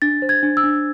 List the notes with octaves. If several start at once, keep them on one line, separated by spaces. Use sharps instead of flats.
D4 A6
C5
G#6
D4
E6
D4